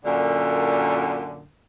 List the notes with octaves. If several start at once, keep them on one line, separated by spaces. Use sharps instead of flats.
F#2 A#2 D3